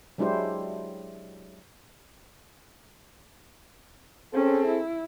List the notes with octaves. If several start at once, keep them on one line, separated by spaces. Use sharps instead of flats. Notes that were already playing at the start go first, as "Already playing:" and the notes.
F#3 G#3 D4 E4 G4 C5
C4 C#4 G#4 A4
E4